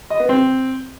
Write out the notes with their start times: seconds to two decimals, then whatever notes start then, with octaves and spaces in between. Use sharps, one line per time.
0.10 D#5
0.20 B3
0.29 C4